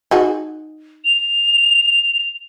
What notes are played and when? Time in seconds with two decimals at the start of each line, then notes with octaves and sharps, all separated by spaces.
0.11 D#4 F#4 G#4
1.04 F7